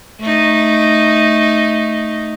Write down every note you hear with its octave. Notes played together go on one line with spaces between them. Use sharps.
A3 D#4